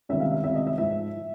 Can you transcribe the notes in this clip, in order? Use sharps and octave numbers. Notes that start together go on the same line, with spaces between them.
C#2 C3 D#3 G3 E5
F5
E5
C#2 C3 D#3 G3 E5
D#5
E5
G#2 F3 E5
F3